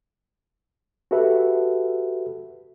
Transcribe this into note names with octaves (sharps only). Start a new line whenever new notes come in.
F#4 G4 A4 B4 E5